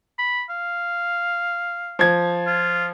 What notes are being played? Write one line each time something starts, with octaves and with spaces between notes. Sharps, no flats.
B5
F5
F3 G#6
F4